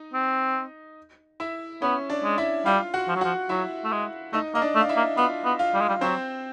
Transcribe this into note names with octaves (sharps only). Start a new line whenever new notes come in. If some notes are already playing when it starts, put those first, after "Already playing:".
Already playing: D#4 D#5
C4
E4 E5
B3 C#4 C#5
D4 D5
G#3
E4 E5
G3 F4 F5
F#4 F#5
F3
F#3
F3 F#4 F#5
F#3 E4 E5
A3
G#3
A3 D#4 D#5
A#3 D#5
D4 D5
A3
F5
E4 E5
A#3
B3 F4 F5
B3
F4 F5
G3
G#3
G3
F#3 C4 C5